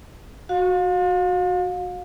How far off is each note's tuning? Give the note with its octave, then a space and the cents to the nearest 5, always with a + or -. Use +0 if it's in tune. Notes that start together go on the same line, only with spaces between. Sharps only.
F#4 -10 F5 +35